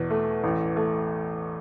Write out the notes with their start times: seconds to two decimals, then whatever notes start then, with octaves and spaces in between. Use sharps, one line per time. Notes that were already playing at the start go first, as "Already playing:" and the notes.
Already playing: E2 B2
0.10 A3
0.44 A1
0.76 A3